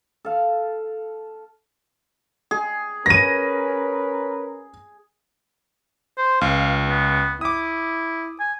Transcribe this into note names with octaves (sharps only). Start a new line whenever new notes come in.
A4 F5
G#4
C#4 A#4 B4 A#6 D#7
C5
C#2 F5
B3
E4 D6 D#6
G#5